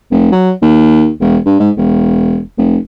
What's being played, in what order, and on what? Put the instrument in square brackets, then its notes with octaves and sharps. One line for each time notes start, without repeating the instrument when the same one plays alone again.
[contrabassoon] F1
F#3
D#2
E1
G2
G#2
E1
F1